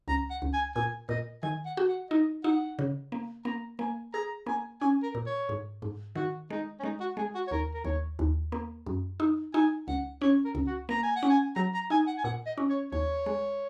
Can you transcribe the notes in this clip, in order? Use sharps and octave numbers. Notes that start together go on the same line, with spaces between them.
C#2 A#5
F#5
C#2
G#5
A#2 G#5
A#2 D#5
D#3 G#5
F#5
F#4
F#5
D#4 D#5
D#4 F#5
C#3
A#3
A#3 A#5
A#3 G#5
G#4 A#5
A#3 G#5
C#4 G#5
A#4
A#2
C#5
G#2
G#2
D#3 F#4
G#3 D#4
C#4
G#3 D#4
F#4
G#3 G#4
F#4
C#5
D#2 A#4
A#4
D#2 C#5
D#2
A#3
F#2
D#4
D#4 G#5
C#2 F#5
C#4 C#5
A#4
C#2
F#4
A#3 A#5
G#5
F#5
C#4
G#5
F#3 A#5
A#5
D#4 G#5
F#5
G#5
A#2 F#5
D#5
C#4
C#5
D#2 C#5
G#3